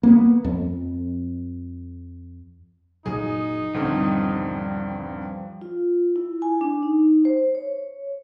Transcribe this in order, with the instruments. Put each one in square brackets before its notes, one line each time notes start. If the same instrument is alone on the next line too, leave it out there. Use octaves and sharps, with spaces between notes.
[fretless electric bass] A#3 B3
F2
[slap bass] F#1 A#2 F#3 [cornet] D#4 [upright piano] G#4
[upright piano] D#1 G2 C4 [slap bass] D3 E3 [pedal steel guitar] F3 G3
[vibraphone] F4
E4
G#5
D4
D#4
C5
C#5